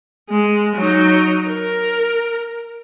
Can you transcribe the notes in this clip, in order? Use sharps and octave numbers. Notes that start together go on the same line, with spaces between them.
G#3
F#3 D#4
A#4